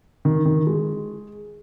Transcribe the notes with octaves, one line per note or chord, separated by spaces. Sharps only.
D#3
D#3
G#3